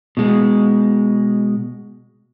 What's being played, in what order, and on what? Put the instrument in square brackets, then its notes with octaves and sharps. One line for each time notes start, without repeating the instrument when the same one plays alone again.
[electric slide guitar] B2 G#3